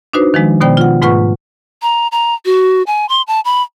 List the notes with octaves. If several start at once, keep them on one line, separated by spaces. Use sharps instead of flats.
D4 D#4 F#4 B4 C5
D#3 F3 G#3
B2 D#3 B3 C5 D5 G5
F4 F#5
G#2 A3 F4 B4 F#5 C#6
A#5
A#5
F#4
G#5
C6
A5
B5